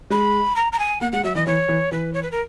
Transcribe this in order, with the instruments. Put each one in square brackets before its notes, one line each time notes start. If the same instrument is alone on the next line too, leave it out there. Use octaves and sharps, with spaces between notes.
[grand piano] G#3 [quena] B5
[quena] A#5
A#5
G#5
[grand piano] A#3 [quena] F#5
[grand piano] G#3 [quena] F#5
[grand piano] F#3 [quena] E5
[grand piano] E3 [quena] D#5
[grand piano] E3 [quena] C#5
[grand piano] E3
[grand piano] E3 [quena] B4
[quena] C#5
B4
A#4